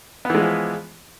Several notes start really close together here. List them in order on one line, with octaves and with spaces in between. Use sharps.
B3 E3 G#3 F3